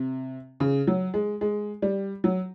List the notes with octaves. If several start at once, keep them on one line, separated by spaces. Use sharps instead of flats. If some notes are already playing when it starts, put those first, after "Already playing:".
Already playing: C3
C#3
F#3
G#3
G#3
G3
F#3